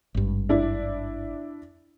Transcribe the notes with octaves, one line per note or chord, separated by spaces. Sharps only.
G#1 G2
D4 E4